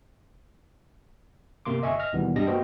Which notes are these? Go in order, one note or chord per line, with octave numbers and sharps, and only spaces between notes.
G2 C3 A#3 C6 D6
G1 D#5 E5 G#5 C#6
D#5 F6 A#6
D#2 B2 D#3 E3 G3 B3
G2 G3 D4 G4 D#5 A#6
A#3 B3 F#4 C5 D#5 G5